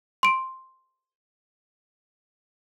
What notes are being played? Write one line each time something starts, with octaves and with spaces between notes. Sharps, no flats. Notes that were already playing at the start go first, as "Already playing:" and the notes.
C6 D7